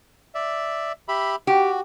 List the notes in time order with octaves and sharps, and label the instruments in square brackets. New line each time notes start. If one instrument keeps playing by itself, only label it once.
[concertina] D5 E5
G4 E5 B5
[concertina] F#4 [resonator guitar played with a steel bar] G4